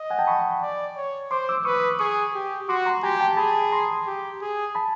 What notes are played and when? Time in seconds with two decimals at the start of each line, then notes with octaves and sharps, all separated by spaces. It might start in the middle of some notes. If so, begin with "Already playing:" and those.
Already playing: D#5
0.10 F#5 G#5
0.19 G5 A5
0.27 B5 C#6
0.62 D5
0.97 C#5
1.31 C5 C6 D6
1.49 D6 E6
1.65 B4 C#6 D#6
1.99 G#4 C#6 D#6
2.34 G4
2.69 F#4 C6 D6
2.86 A#5 C6
3.03 G4 G#5 A#5
3.20 G5 A5
3.37 G#4 A5 B5
3.72 A#5 C6
4.07 G4
4.41 G#4
4.75 A5 B5